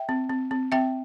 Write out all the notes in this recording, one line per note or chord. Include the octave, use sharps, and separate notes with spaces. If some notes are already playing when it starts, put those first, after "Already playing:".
Already playing: E5 G5
C4
C4
C4
C4 E5 G5